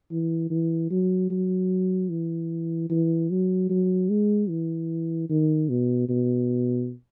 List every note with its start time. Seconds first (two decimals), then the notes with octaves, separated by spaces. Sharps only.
0.11 E3
0.51 E3
0.91 F#3
1.31 F#3
2.10 E3
2.90 E3
3.30 F#3
3.70 F#3
4.09 G#3
4.49 E3
5.29 D#3
5.69 B2
6.09 B2